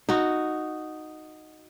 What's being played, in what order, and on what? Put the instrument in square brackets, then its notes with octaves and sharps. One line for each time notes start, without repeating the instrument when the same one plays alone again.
[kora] D#4 F#4